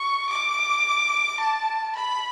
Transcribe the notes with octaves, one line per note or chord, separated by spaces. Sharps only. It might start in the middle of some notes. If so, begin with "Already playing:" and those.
Already playing: C#6
D6
A5
B5